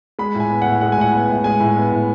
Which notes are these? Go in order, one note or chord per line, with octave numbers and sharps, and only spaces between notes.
G#3 B5
A2 G#5
B3
A2 F#5
G#3 F#5
G#5
A2 F#5
B3
A2
G#3 G#5
A2
B3
A2